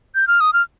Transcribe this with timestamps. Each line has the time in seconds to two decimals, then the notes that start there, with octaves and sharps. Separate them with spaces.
0.15 G6
0.28 F6
0.40 D#6
0.53 F6